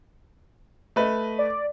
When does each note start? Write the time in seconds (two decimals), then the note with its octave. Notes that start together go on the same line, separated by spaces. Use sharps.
0.96 A3 B4 D#5
1.39 D5